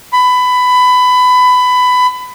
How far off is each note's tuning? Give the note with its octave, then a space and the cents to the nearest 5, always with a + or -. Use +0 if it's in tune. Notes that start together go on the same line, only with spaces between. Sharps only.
B5 +20